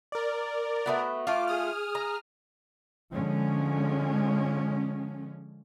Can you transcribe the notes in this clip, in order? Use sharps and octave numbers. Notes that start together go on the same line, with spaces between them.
A#4 D5
A3 B3 F#4
A3 F4 D6
G#4 D#6 F6
A#5
D3 F3 G#3 C#4